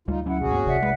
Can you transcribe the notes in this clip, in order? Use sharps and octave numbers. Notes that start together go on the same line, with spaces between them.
D2 G3 D#4 F4
F#3 C#4 E4 F#5
B1 E3 C#4 F#4 G#4
G2 A#3 C4
F#1 C2 D5 E5 F#5
F#2 G#3 B4